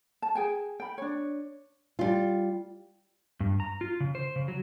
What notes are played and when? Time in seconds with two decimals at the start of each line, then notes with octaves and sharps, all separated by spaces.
0.22 A5
0.35 G#4 G5 G#5
0.80 G5 B5
0.98 D4 C#5
1.99 G3 F4
3.40 G2
3.60 A#5
3.81 F4
4.00 C#3
4.15 C5
4.36 C#3
4.48 F#3